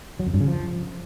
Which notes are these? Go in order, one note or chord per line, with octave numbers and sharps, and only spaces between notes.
F#3
F2
G2
C#3
F3